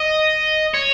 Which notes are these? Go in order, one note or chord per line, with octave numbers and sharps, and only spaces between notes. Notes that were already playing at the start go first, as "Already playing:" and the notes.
Already playing: D#5
C#5